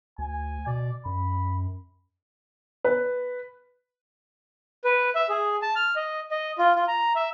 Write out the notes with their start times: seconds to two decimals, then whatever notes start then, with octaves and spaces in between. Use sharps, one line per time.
0.18 D2 G#5
0.67 B2 D5
1.05 F#2 B5
2.84 B4
4.84 B4
5.15 E5
5.29 G#4
5.62 A5
5.76 F6
5.96 D#5
6.31 D#5
6.58 F4
6.76 F4
6.88 A#5
7.16 E5